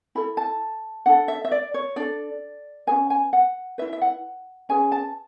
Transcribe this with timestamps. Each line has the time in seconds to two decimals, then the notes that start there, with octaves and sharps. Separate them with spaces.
0.15 E4 A4 B5
0.37 A5
1.06 D4 A4 F#5
1.28 E5
1.45 E5
1.51 D5
1.74 C#5
1.96 D4 A4 D5
2.87 C#4 G#4 B4 G#5
3.10 G#5
3.33 F#5
3.78 E4 B4 E5
3.93 E5
4.01 F#5
4.69 C#4 G#4 B4 G#5
4.92 A5